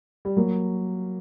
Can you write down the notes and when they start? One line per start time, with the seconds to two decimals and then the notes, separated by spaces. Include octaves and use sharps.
0.25 G3
0.37 F#3 A#3